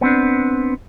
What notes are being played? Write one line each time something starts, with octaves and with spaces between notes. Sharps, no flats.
B3 C4 D4